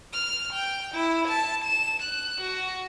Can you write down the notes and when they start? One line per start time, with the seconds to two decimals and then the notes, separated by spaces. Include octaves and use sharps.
0.13 F6
0.53 G5
0.95 E4
1.28 A5
1.65 E7
2.02 F#6
2.41 F#4